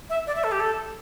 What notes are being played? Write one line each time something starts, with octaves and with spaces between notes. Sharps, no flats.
E5
D5
E5
A4
G4
A4